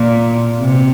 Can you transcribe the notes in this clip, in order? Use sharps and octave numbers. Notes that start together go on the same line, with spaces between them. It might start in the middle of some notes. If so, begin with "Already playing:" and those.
Already playing: A#2
C3